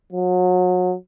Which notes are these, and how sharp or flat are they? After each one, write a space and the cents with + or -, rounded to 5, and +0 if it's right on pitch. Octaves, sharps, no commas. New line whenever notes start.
F#3 -30